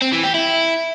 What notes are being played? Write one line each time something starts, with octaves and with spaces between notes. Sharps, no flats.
C4
E3
G4
E4